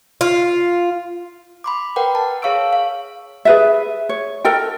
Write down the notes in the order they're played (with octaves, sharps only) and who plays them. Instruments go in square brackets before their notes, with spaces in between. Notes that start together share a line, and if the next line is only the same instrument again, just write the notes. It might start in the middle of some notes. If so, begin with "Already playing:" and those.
[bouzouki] F4
[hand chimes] B5 C6 D6
A#4 B4 F#5 G5
A5
G#4 C#5 F5 C#6 E6 D7
F5
[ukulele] G#4 B4 E5
C#5
A4 A#4 G5